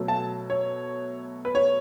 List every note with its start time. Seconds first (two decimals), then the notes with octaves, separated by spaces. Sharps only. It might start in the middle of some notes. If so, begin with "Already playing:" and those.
Already playing: B2 F#3 A3
0.08 A5
0.50 C#5
1.45 B4
1.55 C#5